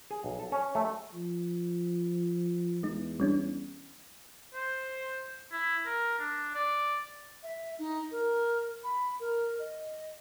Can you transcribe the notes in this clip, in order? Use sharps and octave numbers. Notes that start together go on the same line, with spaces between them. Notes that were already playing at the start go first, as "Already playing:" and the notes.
G#4
B1
A4
C#4
A3
F3
E2 G#3 D#4
G3 C#4 D4
C5
E4
A#4
D4
D5
E5
D#4
A#4
B5
A#4
D#5